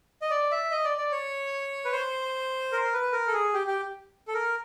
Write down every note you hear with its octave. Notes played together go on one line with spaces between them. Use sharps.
D#5
D5
E5
D#5
D5
D5
C#5
B4
C5
A#4
B4
A#4
A4
G#4
G4
G4
A4
A#4